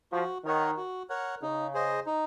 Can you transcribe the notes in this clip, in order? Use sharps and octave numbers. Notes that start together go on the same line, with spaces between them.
F3 F#4
D#3 A#4 C#5 F#5
F#4
A#4 C#5 F#5
C#3 D#4
G#4 C5 D#5
D#4